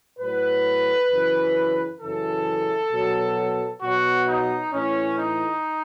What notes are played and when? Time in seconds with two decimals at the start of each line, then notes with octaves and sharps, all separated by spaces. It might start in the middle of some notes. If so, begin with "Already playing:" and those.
0.19 A2 F#3 B4
1.09 F#2 C#3 E3
2.00 F#2 C#3 E3 A4
2.91 B2 F#3
3.81 B2 F#3 F#4
4.27 D#4
4.72 A2 E3 C#4
5.17 D#4